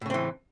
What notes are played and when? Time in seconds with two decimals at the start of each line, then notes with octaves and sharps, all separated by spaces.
0.01 A2
0.06 C#3
0.10 C4
0.14 E3